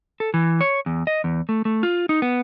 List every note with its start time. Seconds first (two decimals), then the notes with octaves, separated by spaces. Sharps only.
0.20 A4
0.34 E3
0.61 C#5
0.86 E2
1.07 D#5
1.24 E2
1.49 A3
1.65 A3
1.83 F4
2.09 D#4
2.22 B3